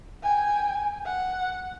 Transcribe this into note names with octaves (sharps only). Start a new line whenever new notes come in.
G5 G#5
F#5